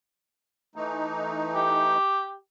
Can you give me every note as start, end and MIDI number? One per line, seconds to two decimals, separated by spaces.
0.76 1.97 52
0.76 1.97 57
0.76 1.97 63
1.55 2.34 67